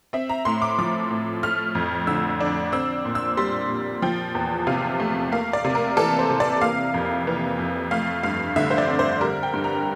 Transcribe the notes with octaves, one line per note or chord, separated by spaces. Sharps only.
C4 E5
A#5
A2 C6
D6
F3 D6
A2
A3 F6
F2
D3 E6
D4
C4 E6
A#2
E6
G3 C6
A#2
F3 G5
E2
C3 F5
A3
A#3 F5
D5
C3
A#4
E3 A4
C5
C3
D5
A#3 F5
F2
E3
F2
A3 F5
G2 F5
D3 E5
C5
D5
C4
C5
G3 A#4
G5
G2
A#5